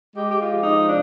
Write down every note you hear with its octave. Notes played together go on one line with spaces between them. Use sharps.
G#3 G4
G4
F4
F3
D#4
C3 D4